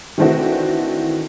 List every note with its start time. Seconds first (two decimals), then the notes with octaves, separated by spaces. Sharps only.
0.18 D#3 E3 A3 C4 D4 F#4